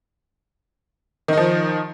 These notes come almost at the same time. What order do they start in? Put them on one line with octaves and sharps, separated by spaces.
D#3 D#4 F3